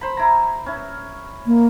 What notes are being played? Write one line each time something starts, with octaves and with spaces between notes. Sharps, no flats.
C5 B5
E4 A#5
C#4 E4
A#3